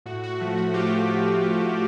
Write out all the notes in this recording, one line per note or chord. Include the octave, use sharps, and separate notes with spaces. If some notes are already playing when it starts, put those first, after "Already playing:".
A2 F#4
F#4
F3 A3
F#4
A2 F4 G4
F3 A3